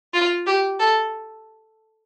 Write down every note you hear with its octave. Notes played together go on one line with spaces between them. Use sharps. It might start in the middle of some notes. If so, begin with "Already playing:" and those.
F4
G4
A4